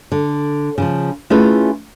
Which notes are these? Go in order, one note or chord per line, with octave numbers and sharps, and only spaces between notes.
D3
C#3 E3 F3
A3 C#4 E4 F4 G#4 B4